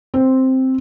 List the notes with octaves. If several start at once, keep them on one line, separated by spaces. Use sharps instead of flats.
C4